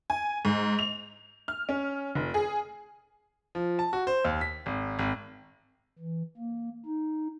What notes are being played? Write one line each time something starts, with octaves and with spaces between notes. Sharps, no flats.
G#5
G#2
F7
F6
C#4
F1
G#4
F3
A5
F#4
C5
D#2
B6
G#1
G#1
E3
A#3
D#4